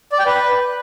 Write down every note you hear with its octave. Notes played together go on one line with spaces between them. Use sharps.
D5
G5
B4